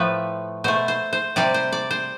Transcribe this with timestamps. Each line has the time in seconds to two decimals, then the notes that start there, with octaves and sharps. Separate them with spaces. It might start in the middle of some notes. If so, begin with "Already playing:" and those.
Already playing: A2 F3 A3 B4
0.64 B2 A3 C5
0.88 C5
1.13 C5
1.36 C3 G3 D5
1.54 C5
1.72 D5
1.91 C5